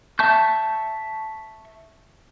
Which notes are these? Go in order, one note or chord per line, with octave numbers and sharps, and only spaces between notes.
E5 A5 C#6 G6